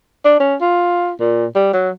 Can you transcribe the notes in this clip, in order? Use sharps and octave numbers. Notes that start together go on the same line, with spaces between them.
D4
C#4
F4
A#2
G3
F#3